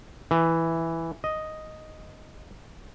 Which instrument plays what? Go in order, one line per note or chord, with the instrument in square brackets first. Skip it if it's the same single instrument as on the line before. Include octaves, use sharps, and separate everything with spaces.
[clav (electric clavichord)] E3
D#5